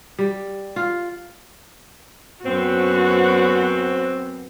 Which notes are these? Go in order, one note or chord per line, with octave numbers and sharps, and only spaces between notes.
G3
F4
F#2 B3 C4 F#4